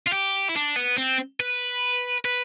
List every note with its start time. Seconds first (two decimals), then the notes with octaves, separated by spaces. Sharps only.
0.07 F4
0.13 G4
0.49 E4
0.55 D4
0.76 B3
0.97 C4
1.40 B4
2.25 B4